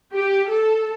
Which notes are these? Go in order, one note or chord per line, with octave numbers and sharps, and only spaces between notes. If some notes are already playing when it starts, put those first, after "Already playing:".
G4
A4